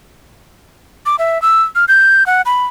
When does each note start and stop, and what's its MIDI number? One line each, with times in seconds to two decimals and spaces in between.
1.06 1.16 86
1.19 1.41 76
1.42 1.62 88
1.75 1.85 89
1.88 2.26 91
2.26 2.42 78
2.46 2.65 83